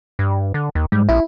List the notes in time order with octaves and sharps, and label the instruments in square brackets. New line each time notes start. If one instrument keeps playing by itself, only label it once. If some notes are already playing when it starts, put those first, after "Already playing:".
[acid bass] G2
D3
D#2
[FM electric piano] G#2 [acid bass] G3
[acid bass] A#1 [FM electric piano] E4